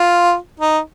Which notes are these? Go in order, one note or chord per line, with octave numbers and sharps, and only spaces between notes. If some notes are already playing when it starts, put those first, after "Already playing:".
Already playing: F4
D#4